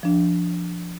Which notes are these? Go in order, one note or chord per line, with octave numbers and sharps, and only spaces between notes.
F3 D4